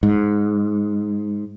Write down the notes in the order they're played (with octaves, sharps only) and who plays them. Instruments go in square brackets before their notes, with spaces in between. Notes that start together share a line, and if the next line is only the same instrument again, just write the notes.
[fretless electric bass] G#2